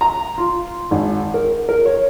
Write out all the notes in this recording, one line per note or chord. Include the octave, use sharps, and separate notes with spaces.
A#5
F4
G#1
A#4
A#4
C#5